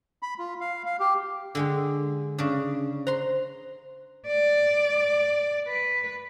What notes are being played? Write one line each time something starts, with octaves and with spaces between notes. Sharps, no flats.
B5
F4
F5
F5
G4
D3 G#3 G4
C#3 D4
C5 A#5 C6
D5
B4